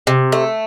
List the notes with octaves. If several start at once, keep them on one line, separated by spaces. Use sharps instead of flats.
C3
A3